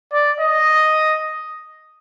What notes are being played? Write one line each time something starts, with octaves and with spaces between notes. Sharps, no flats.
D5
D#5